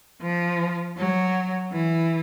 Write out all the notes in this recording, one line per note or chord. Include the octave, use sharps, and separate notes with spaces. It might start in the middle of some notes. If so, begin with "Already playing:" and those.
F3
F#3
E3